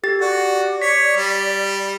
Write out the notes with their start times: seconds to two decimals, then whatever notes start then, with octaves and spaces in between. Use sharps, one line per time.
0.04 G4 A4 A6
0.21 F#4 D5
0.82 C#5 B6
1.17 G3